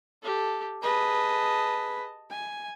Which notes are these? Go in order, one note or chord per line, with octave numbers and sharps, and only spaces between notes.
G4 A4
G#4 B4 D#5 A5
G#5